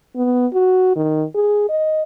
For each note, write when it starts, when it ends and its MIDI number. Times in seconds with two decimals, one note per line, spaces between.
0.16 0.46 59
0.54 0.91 66
0.96 1.24 51
1.35 1.68 68
1.69 2.03 75